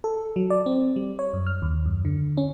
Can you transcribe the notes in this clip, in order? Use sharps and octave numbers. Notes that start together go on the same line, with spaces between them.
A4
F#3
D5
C4
G3
C#5
F#2
F6
D#2
F#2
D3
C#4